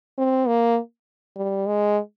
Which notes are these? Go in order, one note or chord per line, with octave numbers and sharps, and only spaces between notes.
C4
A#3
G3
G#3